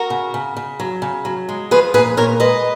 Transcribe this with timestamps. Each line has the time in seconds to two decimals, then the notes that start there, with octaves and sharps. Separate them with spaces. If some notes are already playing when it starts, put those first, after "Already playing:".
Already playing: F#4 A#4
0.10 C#3
0.34 C#3
0.57 C#3
0.80 F#3
1.02 C#3
1.25 F#3
1.49 G#3
1.71 F3 G#4 B4
1.94 A#2 G#4 B4
2.17 A#2 A#4 C#5
2.40 G#3 B4 D#5